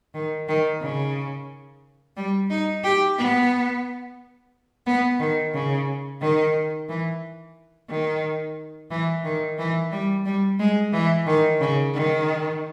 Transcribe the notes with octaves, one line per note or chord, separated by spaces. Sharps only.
D#3
D#3
C#3
G3
D#4
G4
B3
B3
D#3
C#3
D#3
E3
D#3
E3
D#3
E3
G3
G3
G#3
E3
D#3
C#3
D#3